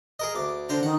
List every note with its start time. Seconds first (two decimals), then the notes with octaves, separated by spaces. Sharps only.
0.19 G#4 A#4 D#5
0.35 D2 D6
0.69 D3 D4 C5 A#5
0.83 D#3 F#5